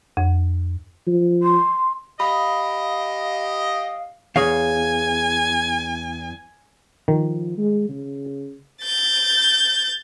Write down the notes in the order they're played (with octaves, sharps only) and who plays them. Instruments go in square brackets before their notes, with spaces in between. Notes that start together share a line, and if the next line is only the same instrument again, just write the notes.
[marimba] F2
[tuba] F3
[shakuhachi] C6
[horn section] G4 D#5 [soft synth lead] F5 [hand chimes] B5
[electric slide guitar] E2 [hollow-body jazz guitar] G#4 C#5 F5 [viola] G#5
[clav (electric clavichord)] D#3 [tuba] F3
[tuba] G#3
C#3
[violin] G6 A6